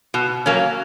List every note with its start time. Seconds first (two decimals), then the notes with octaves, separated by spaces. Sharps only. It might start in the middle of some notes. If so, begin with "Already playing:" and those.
0.14 B2
0.46 F#3 A#3 C#4